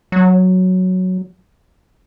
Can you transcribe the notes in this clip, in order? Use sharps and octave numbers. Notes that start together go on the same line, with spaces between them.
F#3